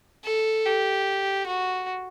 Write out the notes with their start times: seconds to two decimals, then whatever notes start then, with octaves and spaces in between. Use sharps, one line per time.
0.24 A4
0.65 G4
1.46 F#4